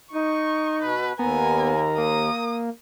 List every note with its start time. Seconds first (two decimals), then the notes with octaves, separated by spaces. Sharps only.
0.14 D#4 C#6
0.82 B2 B4
1.19 D#2 B3 A#4 G#5 A#5
1.98 A#3 D#6